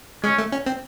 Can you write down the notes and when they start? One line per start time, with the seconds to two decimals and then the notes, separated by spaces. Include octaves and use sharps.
0.24 G#3 C#4
0.38 A3
0.52 C#4
0.66 C4